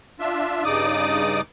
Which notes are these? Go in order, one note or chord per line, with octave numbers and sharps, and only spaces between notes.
D4 F4 E5
G2 C#3 D#4 D5 D6 D#6